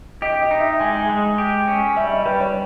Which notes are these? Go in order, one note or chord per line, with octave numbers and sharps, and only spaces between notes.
G4 D#5
D#5
D#4
E5
G#3 G#5
G#3
G4
C#4
G3 E5
D#5
G3 B4
C#5